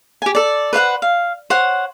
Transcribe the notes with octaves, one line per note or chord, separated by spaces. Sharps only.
G4 G#5
A4 D5
B4 C5 F5 F#5
F5
C5 C#5 F#5